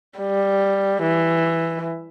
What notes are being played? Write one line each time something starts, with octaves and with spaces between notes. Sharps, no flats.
G3
E3